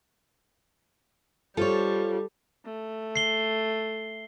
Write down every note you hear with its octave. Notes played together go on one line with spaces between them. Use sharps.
G3 F4 A4 C5 C#5
A3
C7 G7